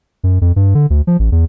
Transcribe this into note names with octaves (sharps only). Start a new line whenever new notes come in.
F#2
F2
G2
D3
D2
F3
A1
E2